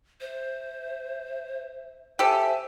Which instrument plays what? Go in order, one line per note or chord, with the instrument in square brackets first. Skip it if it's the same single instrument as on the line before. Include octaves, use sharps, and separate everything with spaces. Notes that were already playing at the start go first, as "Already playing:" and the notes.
[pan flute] C5 [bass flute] E5
[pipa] G4 A4 [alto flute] C5 [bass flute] E5 [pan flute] G#5